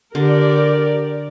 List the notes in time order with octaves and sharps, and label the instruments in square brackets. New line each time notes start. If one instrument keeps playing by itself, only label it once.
[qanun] D3 [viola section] G4 A#4 D5